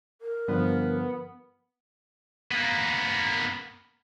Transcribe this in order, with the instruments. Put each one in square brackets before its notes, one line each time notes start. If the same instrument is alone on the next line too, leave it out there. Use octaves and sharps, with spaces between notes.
[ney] A#4
[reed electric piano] G2 D3 F3 [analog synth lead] B3
[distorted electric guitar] A#3 B3